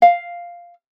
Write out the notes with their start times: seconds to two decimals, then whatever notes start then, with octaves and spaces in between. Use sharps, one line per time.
0.02 F5